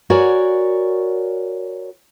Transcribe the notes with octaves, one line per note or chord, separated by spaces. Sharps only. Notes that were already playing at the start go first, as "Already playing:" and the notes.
F#4 A#4 C#5 D5 G#5